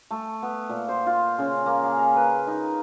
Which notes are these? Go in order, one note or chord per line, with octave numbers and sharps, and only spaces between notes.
A3
B3
A#2
C5
F4
C#3
A#3
G#4
A#5
B4
D#4